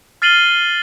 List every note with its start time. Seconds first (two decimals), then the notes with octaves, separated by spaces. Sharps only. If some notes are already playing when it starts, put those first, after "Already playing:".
0.22 F6 A6 C7 D#7 F#7 G7